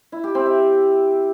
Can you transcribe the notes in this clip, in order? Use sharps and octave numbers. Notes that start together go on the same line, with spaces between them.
E4
G4
C4
E5